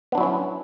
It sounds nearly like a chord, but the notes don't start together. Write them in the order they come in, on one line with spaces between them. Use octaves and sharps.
B3 D4 F#3 E4 C#4